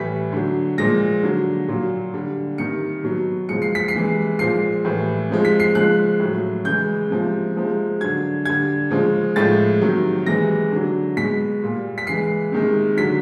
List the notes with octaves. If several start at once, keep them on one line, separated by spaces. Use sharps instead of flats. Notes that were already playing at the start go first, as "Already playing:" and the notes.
Already playing: A2 E3 G3 B6
D3 F#3
A#2 F3 G#3 A#6
D3 F#3
A#2 F#3
D3 G3
C3 D#3 G3 C#7
B2 F#3
C#3 F3 G#3 C#7
C7
B6
C7
C3 E3 G#3
A#2 F3 G#3 C7
A2 E3 G3
C3 F3 G#3
B6
C7
C#3 F3 G#3 F#6
A2 F#3
C#3 E3 G#3 G6
C3 F3 G#3
C3 F3 G#3
D3 F#3 G#6
D3 G3 G#6
C#3 F3 G#3
A2 F3 G#3 A6
C3 D#3 F#3
C3 E3 G#3 A#6
D3 F#3
B2 G#3 B6
A#2 G3
B6
C#3 E3 G#3 C7
C3 D#3 G#3
D3 F#3 B6